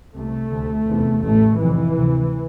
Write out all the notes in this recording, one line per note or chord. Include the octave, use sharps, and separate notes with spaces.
C2 C3 A3
D2 C3
F1 E2 C3
A1 A2 A3
F1 F2 C3 E3
D2 C3